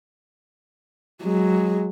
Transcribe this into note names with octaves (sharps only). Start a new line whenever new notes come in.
F#3 G#3